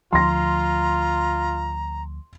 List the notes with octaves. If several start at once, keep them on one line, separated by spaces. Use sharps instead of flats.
D2 F3 F4 A#5 C6 A#6